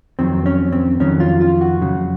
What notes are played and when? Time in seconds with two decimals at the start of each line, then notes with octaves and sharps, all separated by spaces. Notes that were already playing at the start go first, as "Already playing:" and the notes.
0.19 F2 D#3 F#3 C4
0.46 C#4
0.72 C4
1.00 F2 D#3 F#3 C#4
1.20 F4
1.41 F4
1.61 F#4
1.81 F2 C#3 F#3